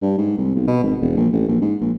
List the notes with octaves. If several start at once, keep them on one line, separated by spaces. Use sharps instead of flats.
G2
G#2
C2
B1
B2
G#1
E1
A#1
A1
A#1
G#2
A#1